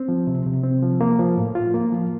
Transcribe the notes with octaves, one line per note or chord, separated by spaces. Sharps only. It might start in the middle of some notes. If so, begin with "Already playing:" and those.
Already playing: C4
F3
C3
C3
C4
F3
A#3
F3
A2
F4
A#3
F3